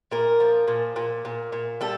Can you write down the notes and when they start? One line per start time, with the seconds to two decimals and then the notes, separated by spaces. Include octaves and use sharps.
0.11 A#2 A#4
0.40 F3
0.68 A#2
0.96 A#2
1.25 A#2
1.52 A#2
1.81 G3 A4